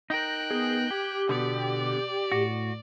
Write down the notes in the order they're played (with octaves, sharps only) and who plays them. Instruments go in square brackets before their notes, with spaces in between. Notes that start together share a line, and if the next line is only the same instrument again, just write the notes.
[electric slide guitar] D#4 A#4 [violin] G5 F#6
[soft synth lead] B3 [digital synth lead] G#4
[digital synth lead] G4 [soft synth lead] G#6
[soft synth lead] B2 [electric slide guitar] D3 B3 [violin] D5
[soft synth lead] A2 [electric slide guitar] F#4